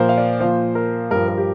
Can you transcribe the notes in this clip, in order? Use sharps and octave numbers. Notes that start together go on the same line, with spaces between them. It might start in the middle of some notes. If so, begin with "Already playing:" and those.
Already playing: A#2 F3 A#4 C5
F5
D5
A#2 F3 C5
A#4
G2 F3 A#4
A#4
G4